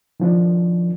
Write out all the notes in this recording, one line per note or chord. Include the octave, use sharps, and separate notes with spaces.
D#3 F3 D4